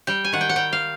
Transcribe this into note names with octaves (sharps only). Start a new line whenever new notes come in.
G3 G5
G#5
D#3 F#5
G5
F#5
G3 G5
F5